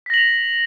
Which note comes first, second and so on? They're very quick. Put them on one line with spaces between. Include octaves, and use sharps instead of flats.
B6 A#6 F#7 F7